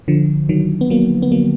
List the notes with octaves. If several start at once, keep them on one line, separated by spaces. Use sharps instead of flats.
D3 F3
D#3 F#3
B3
F#3 A#3
B3
F#3 A#3